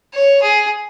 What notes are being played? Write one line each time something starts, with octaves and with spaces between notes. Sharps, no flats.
C#5
G#4